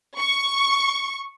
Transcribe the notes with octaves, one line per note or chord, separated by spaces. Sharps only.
C#6